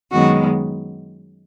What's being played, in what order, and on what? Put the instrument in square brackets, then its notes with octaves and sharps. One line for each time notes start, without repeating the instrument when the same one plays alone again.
[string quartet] F#2 D#3 G#3 B3 F#4